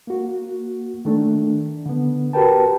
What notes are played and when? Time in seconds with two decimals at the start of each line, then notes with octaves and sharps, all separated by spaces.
0.07 A#3 F#4
1.05 D#3 A3 D4
1.86 D3 B3
2.33 F#4 G4 A#4 B4 G5 A5